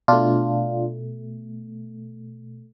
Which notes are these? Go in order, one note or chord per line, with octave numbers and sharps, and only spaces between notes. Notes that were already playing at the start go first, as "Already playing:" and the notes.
B2 A3 D4 F4